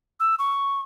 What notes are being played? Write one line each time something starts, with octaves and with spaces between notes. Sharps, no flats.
E6
C#6